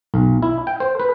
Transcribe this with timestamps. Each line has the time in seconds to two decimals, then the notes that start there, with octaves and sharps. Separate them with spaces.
0.14 B1
0.43 E4
0.67 G5
0.80 C5
1.00 B4